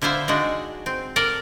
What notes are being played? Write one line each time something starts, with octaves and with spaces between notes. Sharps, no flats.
D3 E4 F4 C5 E5
G#3 D4 D#4 F#4
C4
A4 A#4 D5